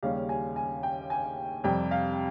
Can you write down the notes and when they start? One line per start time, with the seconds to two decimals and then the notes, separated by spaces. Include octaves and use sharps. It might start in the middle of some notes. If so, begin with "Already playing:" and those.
0.03 D#2 C#3 G3 C#4 F5
0.29 G#5
0.56 G#5
0.83 G5
1.10 G#5
1.64 F2 C3 G3 G5
1.91 F5